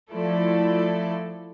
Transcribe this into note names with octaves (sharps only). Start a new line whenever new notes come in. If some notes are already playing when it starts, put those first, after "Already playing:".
F3 A3 E4 A4 D5